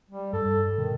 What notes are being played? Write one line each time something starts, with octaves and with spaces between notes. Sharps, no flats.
G3
G2 A4
B2 D#3